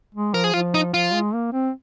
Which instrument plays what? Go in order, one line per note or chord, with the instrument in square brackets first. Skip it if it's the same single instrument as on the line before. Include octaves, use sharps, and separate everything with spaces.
[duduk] G#3
[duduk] F3 [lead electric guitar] A#4
[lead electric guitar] G#4
[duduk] F3 [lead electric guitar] F4
[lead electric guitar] D#4
[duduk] F3 [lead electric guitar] F4
[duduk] G#3
A#3
C4